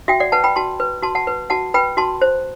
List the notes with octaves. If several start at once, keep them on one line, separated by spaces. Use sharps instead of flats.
F#4 E5 G5
D5 F#5
B4 F#5 A5
G5 B5
F#4 A5 C6
B4
F#4 A5 C6
F#5 A5
B4
F#4 F#5 A5
B4 G5 B5
F#4 A5 C6
C5